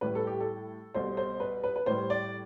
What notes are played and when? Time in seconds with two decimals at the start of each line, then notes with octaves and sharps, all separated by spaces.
0.01 A2 G3 B4
0.15 A4
0.27 G4
0.40 A4
0.94 C2 B2 A3 C5
1.17 C5
1.40 B4
1.64 B4
1.76 B4
1.86 A2 G3 C5
2.10 D5